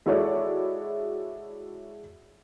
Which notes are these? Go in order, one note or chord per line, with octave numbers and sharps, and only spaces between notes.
G#3 E4 F#4 A4 C#5 D5